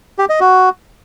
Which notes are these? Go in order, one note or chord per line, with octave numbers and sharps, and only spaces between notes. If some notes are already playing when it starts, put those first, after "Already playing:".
G4
D#5
F#4